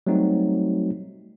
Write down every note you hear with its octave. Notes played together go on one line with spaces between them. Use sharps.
F#3 G3 A3 C4 D#4 F#4